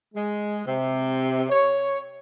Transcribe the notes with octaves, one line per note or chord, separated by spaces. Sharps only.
G#3
C3
C#5